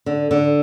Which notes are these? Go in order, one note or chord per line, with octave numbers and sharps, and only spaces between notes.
D3
D3